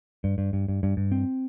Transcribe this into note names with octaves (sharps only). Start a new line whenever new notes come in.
G2
G2
G2
G2
G2
G2
C4